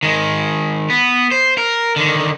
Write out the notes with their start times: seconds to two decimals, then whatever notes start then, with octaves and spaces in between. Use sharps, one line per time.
0.03 D#3 G#3
0.90 B3
1.31 C5
1.58 A#4
1.96 D3 D#3